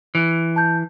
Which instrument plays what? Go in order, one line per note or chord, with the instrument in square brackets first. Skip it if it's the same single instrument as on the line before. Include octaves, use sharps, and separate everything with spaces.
[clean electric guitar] E3
[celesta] A5 G6